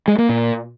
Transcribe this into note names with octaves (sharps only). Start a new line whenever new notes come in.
G#3
A#3
A#2